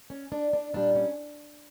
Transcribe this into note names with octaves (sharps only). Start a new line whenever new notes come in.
C#4
D4
D4
A#2 G3 D4
C#4